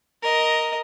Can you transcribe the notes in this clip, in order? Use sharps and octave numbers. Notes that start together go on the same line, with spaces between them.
A#4 D#5